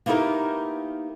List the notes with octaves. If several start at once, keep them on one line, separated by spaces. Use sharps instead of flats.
A#3 B3 D#4 E4 G4 A#4